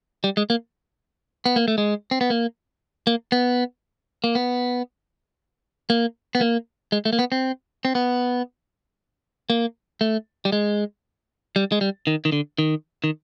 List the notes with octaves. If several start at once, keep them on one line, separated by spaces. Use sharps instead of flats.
G3
G#3
A#3
B3
A#3
A3
G#3
C4
B3
A#3
A#3
B3
A#3
B3
A#3
B3
A#3
G#3
A3
A#3
B3
C4
C4
B3
A#3
A3
G3
G#3
G3
G#3
G3
D#3
D#3
D3
D#3
D#3